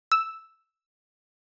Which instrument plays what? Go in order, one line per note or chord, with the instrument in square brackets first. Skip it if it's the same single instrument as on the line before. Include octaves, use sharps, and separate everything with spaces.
[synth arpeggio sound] E6